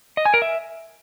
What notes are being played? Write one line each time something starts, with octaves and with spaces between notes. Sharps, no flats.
D#5
G#5
A#4
E5